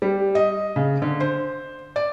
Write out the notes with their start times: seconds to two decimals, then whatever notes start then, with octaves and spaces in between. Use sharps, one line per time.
0.02 G3
0.35 D#5
0.76 C#3
1.02 D3
1.20 C5
1.96 D5